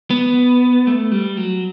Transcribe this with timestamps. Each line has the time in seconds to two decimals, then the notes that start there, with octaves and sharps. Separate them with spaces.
0.10 B3
0.87 A3
1.12 G3
1.37 F#3